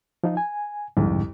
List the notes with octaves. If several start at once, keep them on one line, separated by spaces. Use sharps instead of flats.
F3 D#4 F4
G#5
C2 F2 G#2 D3